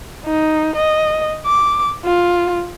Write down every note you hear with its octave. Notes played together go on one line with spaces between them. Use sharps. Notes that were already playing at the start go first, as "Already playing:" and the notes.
D#4
D#5
D6
F4